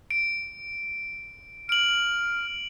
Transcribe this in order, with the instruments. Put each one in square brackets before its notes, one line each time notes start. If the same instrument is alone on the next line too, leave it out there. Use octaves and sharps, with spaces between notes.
[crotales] D7
[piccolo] F6 [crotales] D7 F#7